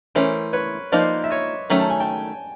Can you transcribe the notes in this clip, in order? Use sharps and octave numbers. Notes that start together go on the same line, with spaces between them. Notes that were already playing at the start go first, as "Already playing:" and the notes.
E3 A3 C#4 A#4 C5
B4 C#5
F3 A#3 D#4 C5 D5
E5
C#5 D#5
D#3 F#3 A3 C#4
A5
G#5
G5 A5